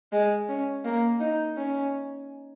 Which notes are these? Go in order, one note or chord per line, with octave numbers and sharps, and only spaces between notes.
G#3
C#4
A#3
D#4
C#4